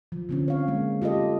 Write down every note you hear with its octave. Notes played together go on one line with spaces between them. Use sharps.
F3
D3 C4 C#4
C#5 F5
G#3 A#3
F4 G4 A4 D#5